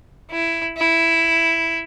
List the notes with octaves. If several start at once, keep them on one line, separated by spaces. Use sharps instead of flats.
E4
E4